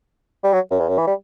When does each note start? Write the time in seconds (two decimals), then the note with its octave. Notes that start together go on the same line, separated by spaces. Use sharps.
0.44 G3
0.53 F#3
0.71 F#2
0.80 E2
0.89 F#2
0.98 E3
1.07 G3